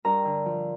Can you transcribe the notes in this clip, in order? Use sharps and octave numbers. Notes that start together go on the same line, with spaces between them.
G2 A#4 A#5
D3
F3